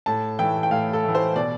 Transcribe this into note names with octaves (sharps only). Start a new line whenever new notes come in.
A2 A5
E3 A3 G5
G5
A2 F5
A4
E3 A3
C5
B2 D5